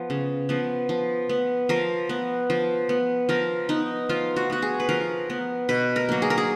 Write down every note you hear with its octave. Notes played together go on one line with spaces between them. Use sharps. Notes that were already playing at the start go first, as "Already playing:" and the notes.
Already playing: F3 B3
C#3
F3 B3
F3
B3
F3 A#4
B3
F3
B3
F3 A#4
B3 D#4
F3 F4
F#4
B3 F#4
G#4
B4
F3 A#4
B3
B2 B4
A#4
F#3 A#3
G#4
A#4
G#4